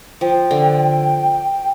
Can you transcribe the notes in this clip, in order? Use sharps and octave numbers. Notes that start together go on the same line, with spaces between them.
F3 G5
D3